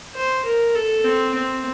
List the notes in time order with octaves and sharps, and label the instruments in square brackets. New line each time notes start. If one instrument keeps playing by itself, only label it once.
[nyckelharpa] C5
A#4
A4
C4
C4